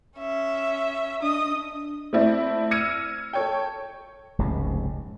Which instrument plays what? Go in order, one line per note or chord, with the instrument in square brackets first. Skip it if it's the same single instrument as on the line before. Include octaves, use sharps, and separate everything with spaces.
[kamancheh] C#4 E5
[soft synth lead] D4 [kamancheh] D#5 D#6
[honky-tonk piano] A3 C4 E4 D5
E6 F6 G#6 A#6 C#7 D#7
A4 C#5 G5
[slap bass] F1 C#2 G#2 C3